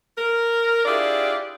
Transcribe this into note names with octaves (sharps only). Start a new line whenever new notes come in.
A#4
D4 E4 F4 G4 G#4 D5